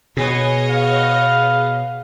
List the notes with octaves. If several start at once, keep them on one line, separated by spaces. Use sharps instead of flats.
B2 B3 G#4 C#5 D#5 G#5
B3 F5